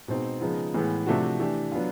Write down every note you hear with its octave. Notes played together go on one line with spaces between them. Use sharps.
B2 G#3 C4 D#4
C#3 F3 G#3 B3 D#4
A2 E3 G#3 B3
C3 F3 A3 D4 F#4
E3 A3 D4 G4
F#3 B3 D4 F4